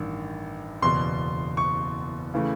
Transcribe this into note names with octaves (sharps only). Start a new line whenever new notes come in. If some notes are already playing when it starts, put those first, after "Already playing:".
Already playing: A1 G2 D#3
F#1 E2 B2 C6
C#6
C#3 E3 A3